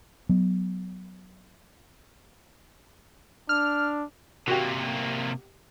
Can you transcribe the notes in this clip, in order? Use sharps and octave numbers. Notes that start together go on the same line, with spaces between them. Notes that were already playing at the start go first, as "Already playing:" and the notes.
F#3 B3
D4 F6
C3 A#3 F#4 G4